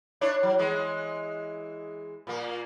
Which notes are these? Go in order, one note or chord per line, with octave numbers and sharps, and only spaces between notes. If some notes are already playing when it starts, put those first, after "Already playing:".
D4 E4 C#5
F#3
E3 G#3
A#2 A#3